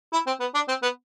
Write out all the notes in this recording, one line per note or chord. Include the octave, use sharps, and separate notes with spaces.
E4
C4
B3
D4
C4
B3